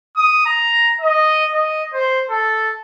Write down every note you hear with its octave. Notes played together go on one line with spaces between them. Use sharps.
D#6
A#5
D#5
D#5
C5
A4